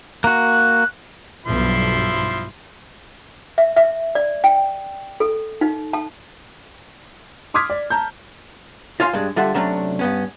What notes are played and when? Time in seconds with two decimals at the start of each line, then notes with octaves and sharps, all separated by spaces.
0.24 A#3 F#4 F#6
1.46 B1 G2 F3 E4 C6
3.58 E5
3.77 E5
4.15 D5
4.44 G5
5.20 A4
5.61 D#4
5.93 A5
7.54 C6 D6 D#6 F6 G#6 B6
7.70 D5
7.90 A5 A#5 G6
9.00 F4 C#5 F5 G#5 C6
9.13 G2 G#3 D4
9.36 D3 G3 F4 A4 E5 F#5
9.54 C3 F#3 A3 C#4 D4
9.99 G2 B3 C#4